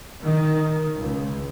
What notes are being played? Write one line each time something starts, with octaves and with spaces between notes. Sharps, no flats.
D#3
C#2